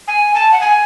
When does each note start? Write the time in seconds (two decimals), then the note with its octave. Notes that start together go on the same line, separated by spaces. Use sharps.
0.08 G#5
0.35 A5
0.52 F#5
0.61 G#5